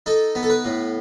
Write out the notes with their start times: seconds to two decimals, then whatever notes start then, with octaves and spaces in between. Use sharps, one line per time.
0.06 D#4 A4
0.35 B3
0.43 A4
0.50 B4
0.65 A2